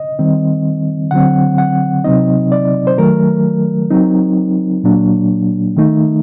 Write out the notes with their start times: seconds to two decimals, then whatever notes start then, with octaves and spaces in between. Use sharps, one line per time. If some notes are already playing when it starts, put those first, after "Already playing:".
Already playing: D#5
0.19 D#3 G3 C4
1.11 D3 F#3 C4 F#5
1.58 F#5
2.04 C3 F#3 C4 D#4 D#5
2.52 D5
2.87 C5
2.97 D#3 F#3 A3 A#4
3.91 F#3 C4 D#4
4.83 A#2 F#3 A#3 D4
5.76 D#3 A3 D#4